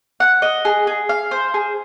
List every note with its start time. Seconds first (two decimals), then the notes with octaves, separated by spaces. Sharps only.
0.20 F#5
0.42 D#5
0.65 G#4
0.87 G#4
1.09 F5
1.31 C5
1.54 G#4